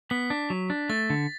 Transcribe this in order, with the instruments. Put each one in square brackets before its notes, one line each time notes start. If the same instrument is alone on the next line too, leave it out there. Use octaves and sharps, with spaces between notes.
[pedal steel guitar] B3 [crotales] B6
[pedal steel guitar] D4
F#3
D4
[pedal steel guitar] A3 [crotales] A6
[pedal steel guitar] D3